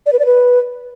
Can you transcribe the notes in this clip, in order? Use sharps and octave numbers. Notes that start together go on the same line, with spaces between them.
D5
B4
D5
B4